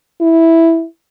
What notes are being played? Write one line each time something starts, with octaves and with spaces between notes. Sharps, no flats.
E4